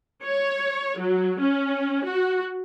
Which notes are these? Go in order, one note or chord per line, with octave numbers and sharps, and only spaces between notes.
C#5
F#3
C#4
F#4